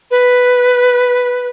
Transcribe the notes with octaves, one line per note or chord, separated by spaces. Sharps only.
B4